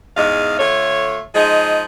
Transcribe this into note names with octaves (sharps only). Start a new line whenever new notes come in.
E2 G#2 G#3 D#5 F5
D3 A3 F4 C#5
F3 G#3 D#4 G#4